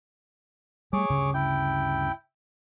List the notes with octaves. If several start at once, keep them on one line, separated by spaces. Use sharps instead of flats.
G3 A3 G#4 C#5 D6
D2 G2 C#3
E4 G5